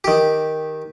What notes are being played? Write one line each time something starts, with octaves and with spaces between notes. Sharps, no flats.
D#3 G4